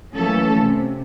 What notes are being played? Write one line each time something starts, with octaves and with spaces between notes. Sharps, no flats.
E3 F#3 A3 A#3 C#4 A4
C3